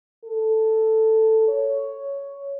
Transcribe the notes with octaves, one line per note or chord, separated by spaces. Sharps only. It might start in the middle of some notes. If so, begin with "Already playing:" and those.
A4
C#5